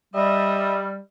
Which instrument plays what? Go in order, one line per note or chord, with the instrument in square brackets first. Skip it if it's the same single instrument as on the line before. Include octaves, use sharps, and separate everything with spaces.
[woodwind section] G3 [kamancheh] D#5 E5